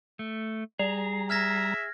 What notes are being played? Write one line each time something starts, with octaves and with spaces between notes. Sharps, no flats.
A3
G3 G#4 A#5
E5 F6 G#6 A#6